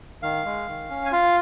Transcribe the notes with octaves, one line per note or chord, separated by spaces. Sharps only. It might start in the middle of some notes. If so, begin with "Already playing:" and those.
D#3 F5
G#3
D#3
C#4
G#5
F4 F5